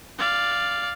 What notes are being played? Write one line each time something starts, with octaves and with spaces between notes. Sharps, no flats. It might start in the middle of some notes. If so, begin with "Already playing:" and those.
D5 F5